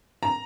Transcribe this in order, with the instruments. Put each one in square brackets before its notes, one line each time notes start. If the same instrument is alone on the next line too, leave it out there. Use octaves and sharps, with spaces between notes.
[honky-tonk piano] A#5